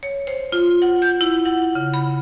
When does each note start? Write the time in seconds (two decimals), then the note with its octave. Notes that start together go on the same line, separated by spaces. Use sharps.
0.03 C#5
0.27 C5
0.52 F4
0.82 F#5
1.02 G6
1.21 E4
1.46 F#5
1.75 C#3
1.94 B5